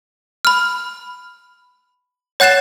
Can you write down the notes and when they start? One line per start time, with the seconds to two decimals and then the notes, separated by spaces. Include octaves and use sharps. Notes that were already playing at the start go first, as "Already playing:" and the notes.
0.45 B5 F6
2.40 C#5 F#5 F#6 A6 C7 E7